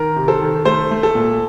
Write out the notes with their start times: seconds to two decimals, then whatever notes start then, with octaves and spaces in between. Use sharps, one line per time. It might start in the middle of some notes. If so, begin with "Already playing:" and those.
Already playing: D#3 A#4
0.16 C3
0.28 A4 C5
0.41 D#3
0.65 A3 A4 C5
0.91 A3
1.03 A4
1.15 A#2